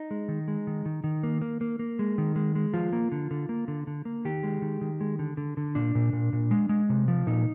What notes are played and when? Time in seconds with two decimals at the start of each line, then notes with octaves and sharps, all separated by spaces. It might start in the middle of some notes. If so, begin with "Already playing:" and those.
Already playing: D#4
0.11 G#3
0.28 D#3
0.48 G#3
0.67 D#3
0.86 D#3
1.04 D#3
1.23 A#3
1.42 A#3
1.61 A#3
1.79 A#3
1.99 G#3
2.18 D#3
2.36 G#3
2.55 G#3
2.74 F3 F4
2.93 A#3
3.12 D3
3.31 D3
3.49 A#3
3.68 D3
3.87 D3
4.05 A#3
4.25 D#3 G4
4.43 G#3
4.62 D#3
4.81 D#3
5.01 G#3
5.19 D3
5.37 D3
5.57 D3
5.75 A#2 D4
5.95 A#2
6.13 A#2
6.33 A#2
6.51 G#3
6.69 G#3
6.89 C3
7.08 F3
7.27 A#2 D#4